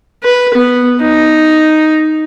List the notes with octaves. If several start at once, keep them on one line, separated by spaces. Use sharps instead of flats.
B4
B3
D#4